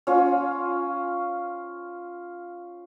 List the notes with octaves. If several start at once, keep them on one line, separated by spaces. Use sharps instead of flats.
C#4 F4